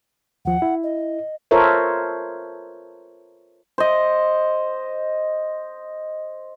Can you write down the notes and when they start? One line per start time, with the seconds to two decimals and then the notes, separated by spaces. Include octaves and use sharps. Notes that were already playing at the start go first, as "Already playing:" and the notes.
0.45 D#2 F3 F#5
0.62 E4
0.83 D#5
1.51 F4 A4 A#4 C5 C#5 E5
3.78 C5 D#5